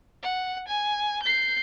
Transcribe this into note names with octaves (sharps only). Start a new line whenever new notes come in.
F#5
G#5
G6 C7